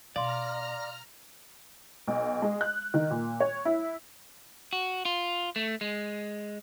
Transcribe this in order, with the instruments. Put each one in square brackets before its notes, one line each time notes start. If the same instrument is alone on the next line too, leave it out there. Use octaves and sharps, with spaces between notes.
[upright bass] B2 [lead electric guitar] D5 [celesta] F5 C6 [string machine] A#5 F6
[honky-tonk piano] B1
G#3
F#6
D#3
A#2
C#5
E4
[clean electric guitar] F#4
F4
A3
G#3